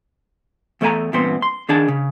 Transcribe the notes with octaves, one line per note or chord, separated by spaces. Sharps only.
E2 A3 A4 D5 G#5 A#5
E2 G2 A#2 B3 C4 C6
C6
D#3 D4 G#4 A5
C#3